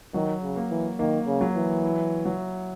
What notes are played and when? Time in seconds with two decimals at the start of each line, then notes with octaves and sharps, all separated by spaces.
0.14 D#3 F#3
0.43 C#3
0.56 A#3
0.70 E3
0.99 D#3 A#3
1.27 C#3
1.41 F#3
1.56 E3
1.84 E4
2.25 F#3